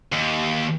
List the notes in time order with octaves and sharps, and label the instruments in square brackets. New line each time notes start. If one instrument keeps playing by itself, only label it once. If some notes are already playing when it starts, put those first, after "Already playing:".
[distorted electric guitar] D#2